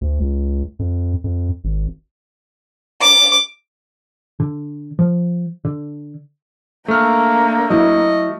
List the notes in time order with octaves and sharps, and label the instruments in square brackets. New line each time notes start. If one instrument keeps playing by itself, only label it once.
[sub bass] D2
C#2
F2
F2
G#1
[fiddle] D6
[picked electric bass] D3
F3
D3
[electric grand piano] A3 F6 [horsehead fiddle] A#3 D4
[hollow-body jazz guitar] F#3 E4 [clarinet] D#5